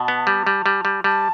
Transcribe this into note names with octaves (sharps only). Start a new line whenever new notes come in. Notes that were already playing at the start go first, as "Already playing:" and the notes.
Already playing: B2 A5
B3
G3
G3
G3
G3
G3 A5